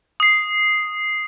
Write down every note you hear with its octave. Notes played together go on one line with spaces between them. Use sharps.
D#6 C7